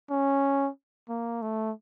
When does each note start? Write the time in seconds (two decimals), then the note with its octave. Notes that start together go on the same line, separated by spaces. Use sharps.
0.11 C#4
1.09 A#3
1.42 A3